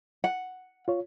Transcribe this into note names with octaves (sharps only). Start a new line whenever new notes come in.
F#5
F4 C#5